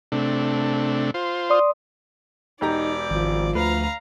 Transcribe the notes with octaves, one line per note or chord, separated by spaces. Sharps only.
C3 A3 D4
F4 C5
D5 C6 D#6
E1 D#4 G4 D5 A#5
G#1 F3
D2 B4 F5 A#5